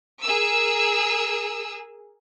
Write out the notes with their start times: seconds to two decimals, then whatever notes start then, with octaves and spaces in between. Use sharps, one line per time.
0.22 G#4 A#4 E6